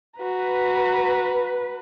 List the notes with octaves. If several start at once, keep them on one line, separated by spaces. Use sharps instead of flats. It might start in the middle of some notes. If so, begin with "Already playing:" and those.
F#4 B4 A#5